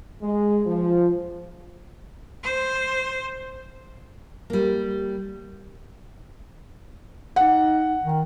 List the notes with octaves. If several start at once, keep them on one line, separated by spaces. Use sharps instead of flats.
G#3
F3
C5
G3 A#3
D#4 F#5
D#3